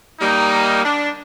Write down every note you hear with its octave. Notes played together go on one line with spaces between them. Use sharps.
G3 A#3 D#4
D4